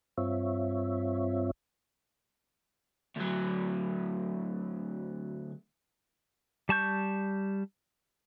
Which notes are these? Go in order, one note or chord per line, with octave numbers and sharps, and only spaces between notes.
G2 C4 F4 C#5 E5
D2 F#3
G3 A5 C#6 G6